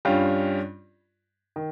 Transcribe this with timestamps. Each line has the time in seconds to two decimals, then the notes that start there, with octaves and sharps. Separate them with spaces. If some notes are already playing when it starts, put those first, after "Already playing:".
0.05 G2 G3 C#4 F4
1.56 D#3